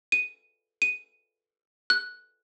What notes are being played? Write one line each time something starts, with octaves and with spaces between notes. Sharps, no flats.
D#7
D#7
F#6